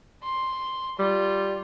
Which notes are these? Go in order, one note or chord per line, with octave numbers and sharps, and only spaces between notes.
C6
G3 F4